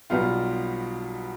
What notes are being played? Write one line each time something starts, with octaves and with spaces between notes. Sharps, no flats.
B1 B2 G3 B3 F4